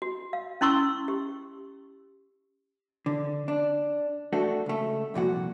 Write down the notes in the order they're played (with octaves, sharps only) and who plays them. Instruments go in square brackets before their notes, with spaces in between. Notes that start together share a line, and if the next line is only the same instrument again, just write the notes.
[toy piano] F#4
F5
C#4 E4 C6 C#6 E6
G4
[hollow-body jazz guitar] D3
D4
A3 D4 F#4 A4
C#2 A3
C2 F2 A#2 F#4